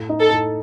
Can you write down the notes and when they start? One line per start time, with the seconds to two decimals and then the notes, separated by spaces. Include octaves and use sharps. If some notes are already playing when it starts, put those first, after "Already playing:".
Already playing: A2
0.09 D#4
0.21 A4
0.33 A2